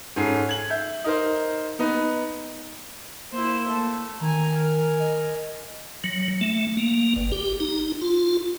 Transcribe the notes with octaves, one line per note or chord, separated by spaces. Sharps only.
G#2 C#4 A4 C7
G#6 F#7
E5 G6
D#4 A#4 C5
B3 D#4 B4
A#3 E4 C5
A3
D#3 G#5 A#5
A#4 G#5
D#5
F#3
A3
A#3
G1
G4
D#4
F4